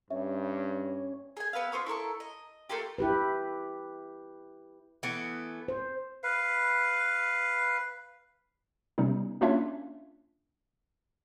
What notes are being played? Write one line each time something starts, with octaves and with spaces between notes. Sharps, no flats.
G2 C#4 E5
G#4 G#5
B3 B4 E5 F5
F4 C5 C#6 D#6
E4 A4 A#4 C#6
D#5
A3 A#3 F4 G4
E4 G4 B4
E3 A3 B3
C5
B4 F5
C3 G3 B3 C#4 D#4
A#3 C#4 D4 F4 C#5 E5